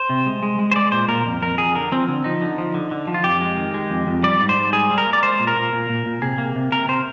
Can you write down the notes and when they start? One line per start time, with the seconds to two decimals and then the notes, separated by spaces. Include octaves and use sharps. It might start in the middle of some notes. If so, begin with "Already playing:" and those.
Already playing: C5
0.09 C3
0.26 G#3
0.43 G#3
0.59 G#3
0.72 C5
0.76 G#3 D5
0.92 A#2 C5
1.08 A#2 A#4
1.26 F2
1.42 F2 A#4
1.58 F2 G#4
1.75 D3 A#4
1.92 F3 C4
2.08 D3 C4
2.24 F3 D#4
2.42 D3
2.58 F3
2.74 D3
2.91 D3
3.07 F3
3.14 F4
3.24 F2 G4
3.41 G#3
3.57 D#3
3.74 G#3
3.90 F2
4.07 F2
4.23 G3 D5
4.41 G#2
4.49 C5
4.57 G#2
4.73 G3 G#4
4.90 G3
4.98 A#4
5.06 A#3
5.13 D5
5.23 G#3 C5
5.40 A#2
5.47 A#4
5.56 A#2
5.72 A#2
5.89 A#2
6.06 A#2
6.22 C3 G#4
6.38 A#3
6.56 C3
6.72 C3 A#4
6.88 C3 C5